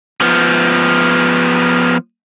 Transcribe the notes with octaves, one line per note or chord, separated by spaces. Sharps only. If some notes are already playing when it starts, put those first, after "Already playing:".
F3 B3